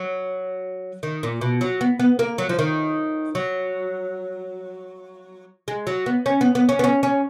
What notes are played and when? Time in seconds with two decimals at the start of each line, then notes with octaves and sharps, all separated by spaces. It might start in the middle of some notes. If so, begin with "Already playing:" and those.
Already playing: F#3
1.03 D#3
1.23 A#2
1.41 B2
1.61 F#3
1.81 B3
1.99 B3
2.19 A#3
2.38 F#3
2.49 F3
2.59 D#3
3.35 F#3
5.68 G#3
5.87 F#3
6.06 B3
6.26 C#4
6.41 B3
6.55 B3
6.69 C#4
6.79 B3
6.84 C#4
7.03 C#4